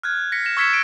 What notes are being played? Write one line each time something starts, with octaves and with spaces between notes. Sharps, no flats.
F6 F#6 G#6
A#6 B6 C#7
A#6 E7
C#6 E6 G#6 B6 C#7 E7
A6 D7